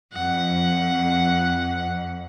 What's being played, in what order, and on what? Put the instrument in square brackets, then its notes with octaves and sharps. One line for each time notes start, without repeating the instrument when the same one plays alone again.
[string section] F2 [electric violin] F#5